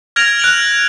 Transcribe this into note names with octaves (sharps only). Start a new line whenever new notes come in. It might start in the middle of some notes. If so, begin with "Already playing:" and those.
F6 G#6 A#6 D7 F7 F#7
F#6 D7 F#7